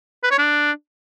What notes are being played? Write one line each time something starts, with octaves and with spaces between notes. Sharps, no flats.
B4
C#5
D4